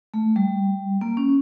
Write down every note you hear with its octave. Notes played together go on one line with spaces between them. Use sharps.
A3
G3
A#3
C#4